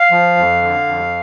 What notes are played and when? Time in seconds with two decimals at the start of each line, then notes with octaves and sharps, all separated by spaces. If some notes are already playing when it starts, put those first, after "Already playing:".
Already playing: F5
0.11 F3
0.37 F2
0.62 D3
0.87 F2